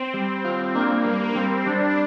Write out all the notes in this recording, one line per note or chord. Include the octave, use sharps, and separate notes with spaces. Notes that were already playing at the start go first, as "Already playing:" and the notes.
Already playing: C4
G3
F4
A#3 D4
G3
G3 C4
G3 D4